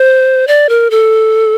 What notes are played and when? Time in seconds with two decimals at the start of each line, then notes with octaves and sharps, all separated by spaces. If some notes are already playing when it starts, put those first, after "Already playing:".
Already playing: C5
0.47 D5
0.69 A#4
0.91 A4